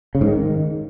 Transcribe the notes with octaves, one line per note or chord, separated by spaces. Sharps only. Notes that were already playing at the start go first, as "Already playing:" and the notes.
C#3
G#2
D#3